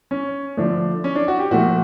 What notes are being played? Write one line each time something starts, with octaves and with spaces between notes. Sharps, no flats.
C#4
D3 F3 A3 D4
C#4
D4
F#4
G4
A#2 F3 A3 F#4